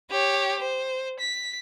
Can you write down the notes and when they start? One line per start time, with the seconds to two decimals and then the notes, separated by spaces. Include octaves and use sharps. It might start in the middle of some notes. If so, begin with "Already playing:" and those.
0.11 G4 C#5
0.59 C5
1.19 B6